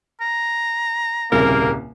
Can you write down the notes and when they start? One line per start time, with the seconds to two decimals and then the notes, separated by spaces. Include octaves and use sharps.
0.20 A#5
1.32 D#1 C2 C#3 A#3 A#4